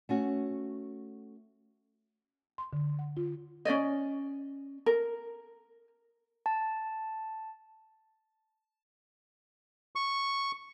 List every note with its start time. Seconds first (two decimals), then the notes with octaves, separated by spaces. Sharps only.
0.09 A3 C#4 F#4
2.58 C6
2.73 D3
2.99 F#5
3.17 F4
3.65 C#4 D4 D5 D#5
4.86 A#4
6.46 A5
9.96 C#6